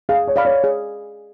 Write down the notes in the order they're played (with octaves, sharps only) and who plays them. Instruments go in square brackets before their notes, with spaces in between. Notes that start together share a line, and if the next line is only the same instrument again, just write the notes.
[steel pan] G#4 [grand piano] F5
[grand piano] C#5
[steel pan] D5 F5 B5
[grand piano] C#5
[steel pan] G#4